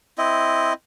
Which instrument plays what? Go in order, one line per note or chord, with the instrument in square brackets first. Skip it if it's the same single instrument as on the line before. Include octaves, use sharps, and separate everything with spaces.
[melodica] C4 E4 D#5